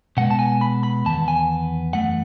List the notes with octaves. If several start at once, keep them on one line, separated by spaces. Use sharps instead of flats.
B2 G#3 B3 F#5
A5
G#5
B5
B5
E2 D#3 B3 A5
G#5
F#2 E3 A3 F#5